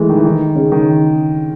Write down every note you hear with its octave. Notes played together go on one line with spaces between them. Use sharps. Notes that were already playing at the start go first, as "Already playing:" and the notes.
Already playing: E3 G#3 A3
D#3
E3
D#3
C#3
D#3